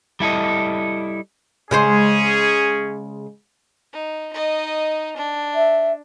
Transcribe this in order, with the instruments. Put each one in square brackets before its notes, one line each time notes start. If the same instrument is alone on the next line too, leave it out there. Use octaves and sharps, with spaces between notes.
[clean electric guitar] G3 E4 A4 D#5
[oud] C#3 G#3 C5 [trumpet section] C#4 G#4
[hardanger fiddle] D#4
D#4 D#5
D4
[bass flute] E5